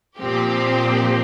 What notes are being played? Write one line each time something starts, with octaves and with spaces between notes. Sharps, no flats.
A#2 F3 C4 G4